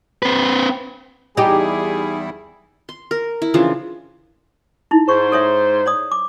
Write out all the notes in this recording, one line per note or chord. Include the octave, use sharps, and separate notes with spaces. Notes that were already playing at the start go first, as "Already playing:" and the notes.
C4 B4
E2 G3 D#4 E4 G4 G#4
C6
A#4
E4
C#3 E3 F3 D4
D#4 E4
G#2 C5 C#6
A4 C#5 E5
C#5 D5 D#6
D6